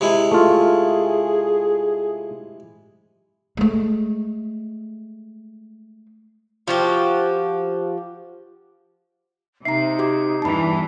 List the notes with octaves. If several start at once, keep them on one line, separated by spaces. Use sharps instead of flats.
C3 G#3 E4
A3 F4 G#4
G#3 A3
F3 F#4 G4
C3 D#4 E5 A#5 C7
F#4 G4 D6
E2 G2 E3 A5 B5